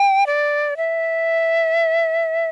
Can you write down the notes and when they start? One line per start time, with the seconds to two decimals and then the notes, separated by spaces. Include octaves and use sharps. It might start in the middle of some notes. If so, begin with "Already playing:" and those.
Already playing: G5
0.27 D5
0.77 E5